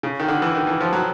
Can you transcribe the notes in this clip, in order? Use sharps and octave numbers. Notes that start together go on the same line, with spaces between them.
C#3
D#3
D3
E3
D#3
E3
F3
F#3